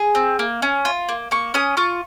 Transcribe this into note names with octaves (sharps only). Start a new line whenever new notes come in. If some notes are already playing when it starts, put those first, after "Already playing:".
Already playing: G#4
C4
A#3
C#4
F4
A#3
A#3 C#6
C#4 D#6
F4 C#6